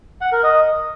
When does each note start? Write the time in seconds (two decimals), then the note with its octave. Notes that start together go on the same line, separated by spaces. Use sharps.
0.21 F#5
0.32 A#4
0.43 D#5